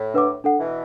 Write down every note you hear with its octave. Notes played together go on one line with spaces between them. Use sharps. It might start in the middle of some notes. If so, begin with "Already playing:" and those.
Already playing: A2
D4 B4 F#5 D6
D4 A4 F#5
B2 E3